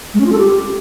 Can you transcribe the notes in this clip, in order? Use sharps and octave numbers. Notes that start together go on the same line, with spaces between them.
G#3
C#4
F4
A4
G4